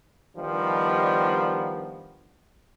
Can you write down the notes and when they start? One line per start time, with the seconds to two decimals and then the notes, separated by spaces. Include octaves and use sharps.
0.37 D#3 F3 G3 B3 D4 D#4